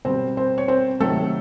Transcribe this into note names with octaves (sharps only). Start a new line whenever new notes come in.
B2 G3 C4 C5
C4 C5
C#5
C4 C5
C3 D#3 F#3 A3 A4